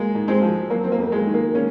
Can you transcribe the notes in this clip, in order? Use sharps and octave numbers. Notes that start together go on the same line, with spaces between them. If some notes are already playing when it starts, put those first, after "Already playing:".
Already playing: G#3 A#3
G#2
G#3 C4
F3
F#3 A#3
C4
A#3
F2
G#3
D#3
A#3
G#3 A#3 C#4